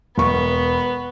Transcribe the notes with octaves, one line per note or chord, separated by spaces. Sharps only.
E1 B3 C#6